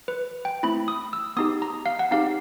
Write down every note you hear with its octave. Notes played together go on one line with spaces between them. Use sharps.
B4
G5
A3 C4 E4 B5
D#6
E6
B3 D#4 G4 D#6
A#5
F5
F#5
C4 D#4 G4 F5